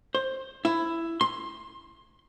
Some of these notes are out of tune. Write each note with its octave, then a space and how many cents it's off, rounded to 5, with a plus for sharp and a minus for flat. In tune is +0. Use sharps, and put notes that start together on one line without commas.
C5 +15
E4 +10
C6 +10